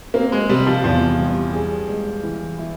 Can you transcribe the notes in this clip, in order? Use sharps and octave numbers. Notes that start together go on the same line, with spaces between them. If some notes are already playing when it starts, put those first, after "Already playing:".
A#3 C4
G#3
C3 G3
F3
E2 F3
G3
G#4
G#3
E3
E4